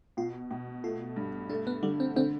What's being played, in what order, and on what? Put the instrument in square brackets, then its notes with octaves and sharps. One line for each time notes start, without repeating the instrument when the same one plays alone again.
[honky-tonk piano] B2 [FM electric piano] F4
[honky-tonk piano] B2
[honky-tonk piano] A3 [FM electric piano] F4
[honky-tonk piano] G2
[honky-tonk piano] A3 [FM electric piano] D4
[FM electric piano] B3
[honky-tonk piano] D3 [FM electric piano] G3
[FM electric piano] C4
[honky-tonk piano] D3 [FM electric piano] C4